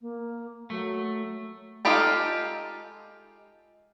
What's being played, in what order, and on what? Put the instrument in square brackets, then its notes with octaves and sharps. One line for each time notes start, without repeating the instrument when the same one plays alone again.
[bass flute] A#3
[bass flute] F#3 [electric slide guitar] A3
[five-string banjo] G#3 D#4 F4 G4 A4